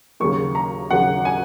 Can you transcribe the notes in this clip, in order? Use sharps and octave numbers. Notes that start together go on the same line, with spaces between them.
D#2 C#3 F#3 A#3 C#6
A#5
D#2 C#3 F#3 A#3 F#5
G#5